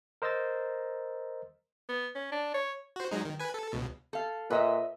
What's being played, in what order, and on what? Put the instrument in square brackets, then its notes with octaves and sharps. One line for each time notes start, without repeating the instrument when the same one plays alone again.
[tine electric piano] A#4 C5 D#5 A#5 E6 A6
[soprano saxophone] B3
C#4
D4
C#5
[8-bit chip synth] F#4 C5
F#3 G#3 D#4
D#3
B4 G#5
A4
C#2 B2
[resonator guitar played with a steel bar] A4 F5
[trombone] A#2 [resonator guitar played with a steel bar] B4 D#5 E5